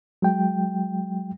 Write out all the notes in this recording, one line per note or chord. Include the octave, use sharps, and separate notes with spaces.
F#3 G#3 G5